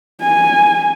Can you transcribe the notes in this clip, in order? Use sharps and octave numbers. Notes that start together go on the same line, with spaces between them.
G#5